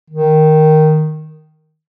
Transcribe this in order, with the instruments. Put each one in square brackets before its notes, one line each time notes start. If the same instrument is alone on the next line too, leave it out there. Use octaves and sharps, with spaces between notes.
[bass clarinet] D#3